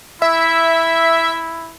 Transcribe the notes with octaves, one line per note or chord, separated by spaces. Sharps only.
E4 E5